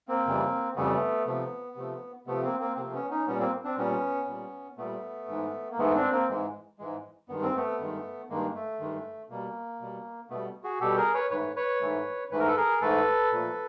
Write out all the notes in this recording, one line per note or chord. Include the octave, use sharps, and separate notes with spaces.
A#3 C4
F2 C#3 E3 G3
F2 C#3 E3 G3 A3 B3
C3 F3 A3
C3 F3 A3
C3 F3 A3 B3
A#3 C4
A#3 C4
C3 F3 A3 A#3 C4
B3 C#4
C#4 D#4
A#2 G3 B3 C#4
A#3 C4
C4 D4
A#2 G3 B3 C#4
A#2 G3
A#2 G3 A3 B3
G#2 E3 G#3
A#3
G#2 E3 G#3 A3 B3
C4 D4
A#3 C4
G#2 E3 G#3
G#2 E3 G#3
G2 D#3 G#3 B3
C4
A3 B3
G2 D#3 G#3
G2 D#3 G#3 A#3
A3
G2 D#3 G#3
B2 G3 A#3
B2 G3
B2 G3 A3 B3
F#4 G#4
B2 G3 G4 A4
G#4 A#4
B4 C#5
G#2 E3 A3 B4 C#5
B4 C#5
G#2 E3 A3
G#2 E3 A3 B4
A#4
A4 B4
G#4 A#4
G#2 E3 A3 A4 B4
A#2 F3 A3